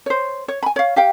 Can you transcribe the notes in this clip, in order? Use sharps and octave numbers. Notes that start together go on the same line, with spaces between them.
C5 C#5
C#5
G#5 B5
C#5 F5
G4 F5 G5